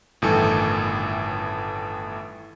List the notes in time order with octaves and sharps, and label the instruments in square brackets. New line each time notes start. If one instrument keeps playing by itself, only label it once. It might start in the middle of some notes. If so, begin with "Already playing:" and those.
[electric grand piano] G1 A2 D#3 E3 A4 G#5